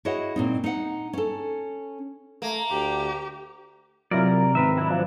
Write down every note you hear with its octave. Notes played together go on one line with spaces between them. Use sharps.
E4 F#4 G#4 C#5 D#5 F#5
A#2 C4 D#4
D#4 F#5
C#4 A4
A3 A#3
D2 G4
C3 F#3 E4 F4 A#4 D5
G#2 D#3 C4 B4 E5
F#3 D4 E4
F3